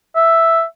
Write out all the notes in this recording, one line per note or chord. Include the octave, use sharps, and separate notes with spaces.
E5